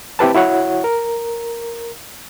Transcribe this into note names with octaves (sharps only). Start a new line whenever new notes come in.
C4 E4 G4 B4 A5
E4 F#4 C#5 F#5
A#4